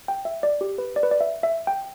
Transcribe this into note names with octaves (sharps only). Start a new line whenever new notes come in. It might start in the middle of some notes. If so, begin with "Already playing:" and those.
G5
E5
D5
G4
B4
D5
B4
D5
E5
E5
G5